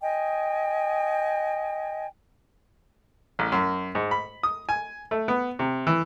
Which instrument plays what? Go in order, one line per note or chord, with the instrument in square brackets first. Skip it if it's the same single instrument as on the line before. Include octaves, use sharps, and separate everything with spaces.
[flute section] D#5 G5 G#5
[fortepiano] A1
F#2
G#2
B5
D#6
G#5
A3
B3
C3
E3